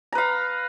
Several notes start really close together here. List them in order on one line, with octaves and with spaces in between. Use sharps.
A#5 B4 F5